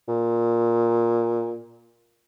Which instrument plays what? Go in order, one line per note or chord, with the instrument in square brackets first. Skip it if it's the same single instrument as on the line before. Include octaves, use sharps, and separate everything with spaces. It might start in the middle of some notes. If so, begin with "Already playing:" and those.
[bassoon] A#2